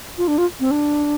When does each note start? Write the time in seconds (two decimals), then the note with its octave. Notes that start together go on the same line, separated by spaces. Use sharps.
0.18 F4
0.28 D4
0.38 F4
0.60 C4
0.71 D4